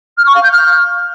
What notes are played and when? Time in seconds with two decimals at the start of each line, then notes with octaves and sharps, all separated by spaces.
0.17 F6
0.26 C#6
0.34 F5
0.43 G6
0.51 F6